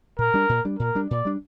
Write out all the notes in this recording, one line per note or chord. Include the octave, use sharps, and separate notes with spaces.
A#2 A#4
G3 D4
A#2
G3 D4
A#2 A#4
G3 D4
A#2 D5
G3 D4